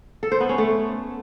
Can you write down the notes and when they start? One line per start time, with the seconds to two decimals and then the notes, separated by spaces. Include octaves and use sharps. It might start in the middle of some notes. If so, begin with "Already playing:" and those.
0.23 A4
0.32 C5
0.40 B3
0.49 C#4
0.58 A3